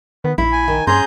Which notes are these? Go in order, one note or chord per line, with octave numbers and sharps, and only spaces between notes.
D#3 B3
A#1 E4 B5
G#5
D#3
G2 C#4 G#4 A#5 C6 G6